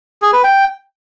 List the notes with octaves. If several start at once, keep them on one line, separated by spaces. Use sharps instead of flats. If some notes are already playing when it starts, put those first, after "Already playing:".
G#4
B4
G5